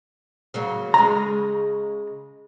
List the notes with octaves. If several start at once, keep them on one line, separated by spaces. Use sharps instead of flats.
C#3 F#3 A#3
C#3 G#3 A#5